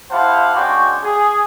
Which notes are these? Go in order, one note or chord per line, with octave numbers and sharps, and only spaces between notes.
E4 G4 C5 F5 F#5 A5
G#3 C#4 D4 F#4 G5 C#6
G#4